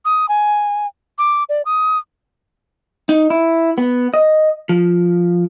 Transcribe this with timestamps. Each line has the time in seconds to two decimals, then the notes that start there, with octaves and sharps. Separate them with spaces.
0.05 D#6
0.29 G#5
1.18 D6
1.49 D5
1.65 D#6
3.09 D#4
3.30 E4
3.78 B3
4.14 D#5
4.69 F3